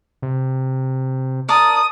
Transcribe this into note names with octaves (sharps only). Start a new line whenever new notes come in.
C3
A#4 D5 A5 D#6